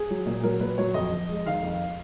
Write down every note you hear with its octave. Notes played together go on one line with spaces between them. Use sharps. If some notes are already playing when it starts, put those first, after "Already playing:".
Already playing: G#4
F#3
A#2
F#3 A#4
A#2 B4
F#3 C#5
F2 D#5
F2
G#3
D#3 F5
F2